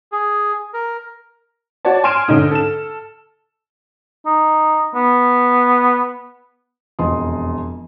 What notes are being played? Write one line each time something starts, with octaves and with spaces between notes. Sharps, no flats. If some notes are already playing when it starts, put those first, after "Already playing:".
G#4
A#4
F#4 C#5 D5 A5
G#5 C6 F6 D7 E7
G#2 D3 C#4 D#4
A4 E7
D#4
B3
E1 F2 D#5 C6 D#6